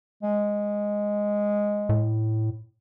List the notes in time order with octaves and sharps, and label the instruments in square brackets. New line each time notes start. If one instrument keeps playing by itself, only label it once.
[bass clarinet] G#3
[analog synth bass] A2